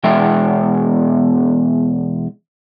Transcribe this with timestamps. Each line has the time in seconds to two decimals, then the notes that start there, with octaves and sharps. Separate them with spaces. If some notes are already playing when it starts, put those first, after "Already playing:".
0.04 E2 B2 G#3 E5 G5